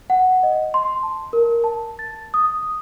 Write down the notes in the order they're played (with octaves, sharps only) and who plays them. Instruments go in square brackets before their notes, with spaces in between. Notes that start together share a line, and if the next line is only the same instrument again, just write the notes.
[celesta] F#5
D#5
C6
A5
A#4
A5
A6
D#6